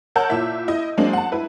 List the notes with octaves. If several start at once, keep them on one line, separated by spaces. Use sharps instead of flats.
A#4 C#5 F#5 A5 E6 G6
A#2 E4 E5
E4 D#5
F#3 G#3 A#3 C4 D4
F#5 A5
E4 B4